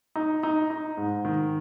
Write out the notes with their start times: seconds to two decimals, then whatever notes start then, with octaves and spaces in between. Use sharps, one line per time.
0.16 D#4
0.43 D#4
0.70 D#4
0.97 G#2
1.25 D#3